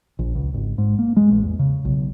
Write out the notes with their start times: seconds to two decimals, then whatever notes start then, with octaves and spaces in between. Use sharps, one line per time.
0.19 A#1
0.35 C#2
0.54 G#1
0.78 G#2
0.99 A#3
1.17 G#3
1.31 A1
1.43 E2
1.59 C#3
1.85 B1